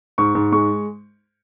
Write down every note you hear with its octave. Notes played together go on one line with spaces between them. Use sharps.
G#2 C#6
G#2
G#3 C#6